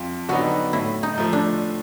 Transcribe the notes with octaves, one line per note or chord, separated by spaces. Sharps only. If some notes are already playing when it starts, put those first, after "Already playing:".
Already playing: F2 F4
D3 F#3 B3 D#4 F#4
A2 E4
D#4
F3 A3
D4